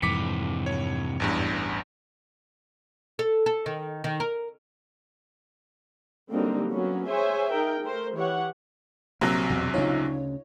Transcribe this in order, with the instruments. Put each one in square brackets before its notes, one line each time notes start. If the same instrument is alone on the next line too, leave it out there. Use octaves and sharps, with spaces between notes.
[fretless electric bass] F2 G#2 [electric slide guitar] C3 E3 [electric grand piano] D6 B6 C#7
[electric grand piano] C#5
A1 E2 G2
[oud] A4
A4
D#3
D#3
A#4
[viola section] D3 F#3 G3 A#3 C4 D#4
F#3 A#3 B3 C#4
G#4 C5 C#5 E5 G#5
D#4 G#4 A#4 G5
A3 A#4 C5
E3 G4 C#5 F#5
[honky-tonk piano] A#1 C3 F#3 [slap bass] A#3
[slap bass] E2 B2
[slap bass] D2 C#3 [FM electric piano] D#4 F4 C#5